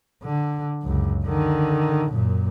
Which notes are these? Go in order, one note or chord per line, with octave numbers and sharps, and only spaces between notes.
D3
C#2 F#2
D3 D#3
F#2 A#2